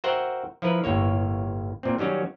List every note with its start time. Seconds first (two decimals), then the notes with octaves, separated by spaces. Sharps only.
0.04 F#4 A#4 C5 E5 F#5 G5
0.62 F3 E4 A#4 B4
0.84 G1 A2 A#3 C#5
1.83 A#2 C4
1.98 D#3 F#3 G3 C#4 F#4